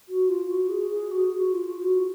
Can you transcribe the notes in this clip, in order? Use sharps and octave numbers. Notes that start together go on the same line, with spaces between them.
F#4
F4
F#4
G#4
G#4
F#4
F#4
F4
F#4